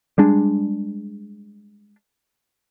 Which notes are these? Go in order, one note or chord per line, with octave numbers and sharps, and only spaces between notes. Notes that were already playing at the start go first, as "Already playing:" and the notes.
G3 G#3 D4